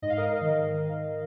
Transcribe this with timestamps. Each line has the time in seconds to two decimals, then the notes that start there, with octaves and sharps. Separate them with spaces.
0.02 G#2 D#5
0.10 F5
0.17 A#4 D#5
0.41 D#3